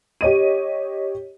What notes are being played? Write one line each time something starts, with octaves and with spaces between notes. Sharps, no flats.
G4 C#5 D#5 D#7